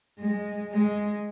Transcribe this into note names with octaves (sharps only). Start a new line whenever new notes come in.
G#3
G#3